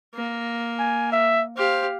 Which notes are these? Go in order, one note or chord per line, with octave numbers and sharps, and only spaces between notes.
A#3
G#5
E5
G4 C5 F5